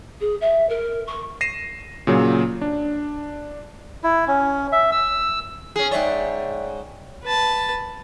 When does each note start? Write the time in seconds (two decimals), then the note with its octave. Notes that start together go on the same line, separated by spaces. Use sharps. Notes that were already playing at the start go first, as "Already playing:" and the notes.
0.21 G#4
0.41 E5
0.69 A#4
1.07 C#6
1.41 A#6 C7 D#7 E7
2.07 A#2 C#3 F#3
2.61 D4
4.03 E4
4.28 C#4
4.72 E5
4.92 E6
5.76 C#4 G#4
5.91 G#2 C#5 D5 E5 G5
7.23 B4 A5